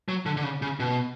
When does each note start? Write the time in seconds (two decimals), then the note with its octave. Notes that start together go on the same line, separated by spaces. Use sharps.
0.08 F#3
0.26 D3
0.37 D3
0.44 C#3
0.62 C#3
0.80 B2